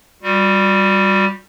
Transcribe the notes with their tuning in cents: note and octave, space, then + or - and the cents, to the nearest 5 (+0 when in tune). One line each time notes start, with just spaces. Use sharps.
G3 +0 F#4 -40